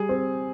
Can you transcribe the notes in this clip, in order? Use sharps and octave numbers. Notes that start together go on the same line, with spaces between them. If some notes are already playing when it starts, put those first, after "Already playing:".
Already playing: G3 G#4
C4